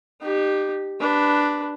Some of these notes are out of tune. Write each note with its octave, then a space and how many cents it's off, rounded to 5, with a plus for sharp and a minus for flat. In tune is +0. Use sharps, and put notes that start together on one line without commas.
D#4 -35 G4 +0
D4 +0 B4 +0